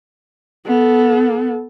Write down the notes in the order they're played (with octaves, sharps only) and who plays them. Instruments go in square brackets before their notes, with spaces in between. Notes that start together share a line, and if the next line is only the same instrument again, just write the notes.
[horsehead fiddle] B3 A4